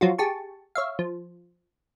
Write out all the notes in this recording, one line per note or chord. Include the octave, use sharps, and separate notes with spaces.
F3 F#3 F4 F#4
G4 G#4 A5 C#6
C#5 E5 F5
F3